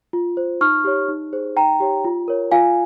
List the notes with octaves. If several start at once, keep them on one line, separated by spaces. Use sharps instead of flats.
F4
C5
D#4 C#6 F6
G4 C#5
D#4
G#4 C5
D#4 G5 A#5
G4 C#5
F4
A#4 C#5
F4 F5 G#5